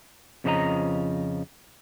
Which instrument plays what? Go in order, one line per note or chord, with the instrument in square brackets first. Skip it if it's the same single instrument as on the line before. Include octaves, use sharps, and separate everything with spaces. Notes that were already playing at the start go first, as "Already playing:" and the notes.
[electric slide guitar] F2 C#3 F3 D4 D#5 A#5